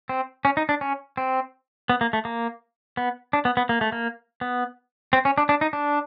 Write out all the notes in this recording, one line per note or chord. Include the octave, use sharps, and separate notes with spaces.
C4
C#4
D#4
D4
C#4
C4
B3
A#3
A3
A#3
B3
D4
B3
B3
A#3
A3
A#3
B3
C4
C#4
D4
D4
D#4
D4